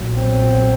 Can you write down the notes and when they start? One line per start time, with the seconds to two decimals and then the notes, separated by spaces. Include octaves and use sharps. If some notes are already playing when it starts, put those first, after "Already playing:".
Already playing: B1 A#2 F#3
0.16 C4